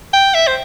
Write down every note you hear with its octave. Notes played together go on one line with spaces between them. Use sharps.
G5
E5
C5